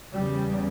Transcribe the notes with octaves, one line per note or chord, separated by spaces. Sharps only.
E2 C#3 G3